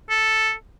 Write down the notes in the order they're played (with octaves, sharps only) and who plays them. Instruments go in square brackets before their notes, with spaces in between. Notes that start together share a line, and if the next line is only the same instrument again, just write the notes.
[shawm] A4